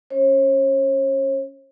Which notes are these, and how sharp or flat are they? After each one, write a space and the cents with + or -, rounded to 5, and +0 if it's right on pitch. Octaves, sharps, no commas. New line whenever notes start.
C#4 +0 C#5 -45